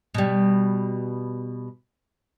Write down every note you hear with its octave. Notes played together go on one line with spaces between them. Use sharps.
B2 G3